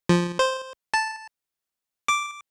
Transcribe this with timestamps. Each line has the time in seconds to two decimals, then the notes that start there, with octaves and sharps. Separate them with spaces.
0.09 F3
0.39 C5
0.94 A5
2.08 D6